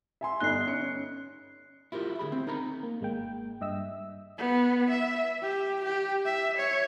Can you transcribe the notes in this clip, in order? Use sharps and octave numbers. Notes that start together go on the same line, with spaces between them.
E5 G#5 C6
G1 D#4 F#6 C7 G7
C#4 C#7
E4 F4 G4 A#4
D2 C#3 G#4 B5
C4
D#4 A#4 A#5 B5
A#3
G#1 G#3 A#3 G5
G2 D#5 E5 E6
B3
E5
G4
G4
E5
C#5